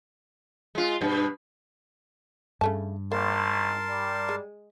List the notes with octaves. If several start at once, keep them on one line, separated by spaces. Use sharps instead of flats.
G#3 F4
G2 B2
G2 C#3 A3 A5
G#1 A#3 A#4 A5 C6
G3
G#3